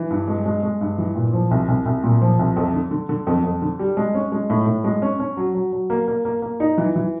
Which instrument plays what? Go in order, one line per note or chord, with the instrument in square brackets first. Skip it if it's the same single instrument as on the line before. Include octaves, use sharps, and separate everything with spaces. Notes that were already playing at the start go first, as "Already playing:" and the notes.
Already playing: [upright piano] E3
G2
G#3
G#3
G#3
G2
E3
A#2
F3
C2
C2
C2
A#2
F3
C2
F2
D3
D3
D3
F2
F2
D3
G3
G#3
C#4
G#3
A2
A2
G#3
C#4
C#4
F#3
F#3
F#3
A#3
A#3
A#3
A#3
D#4
E3
E3